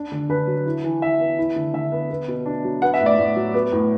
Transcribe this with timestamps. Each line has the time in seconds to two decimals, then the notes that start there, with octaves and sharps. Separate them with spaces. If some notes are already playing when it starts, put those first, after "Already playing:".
Already playing: D4
0.12 D3
0.29 D3 B4
0.47 F#3
0.66 E4
0.84 E3
1.02 E3 E5
1.20 B3
1.38 E4
1.56 D3
1.73 D3 E5
1.92 B3
2.10 B3
2.28 B2
2.46 D4
2.64 F#3
2.82 B3 F#5
2.94 E5
3.01 A2
3.06 D5
3.18 A2
3.36 F#3
3.54 B3
3.72 A2